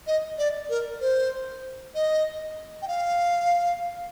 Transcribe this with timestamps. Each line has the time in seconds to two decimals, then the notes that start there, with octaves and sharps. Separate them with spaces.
0.07 D#5
0.38 D5
0.70 A#4
1.01 C5
1.95 D#5
2.82 G5
2.88 F5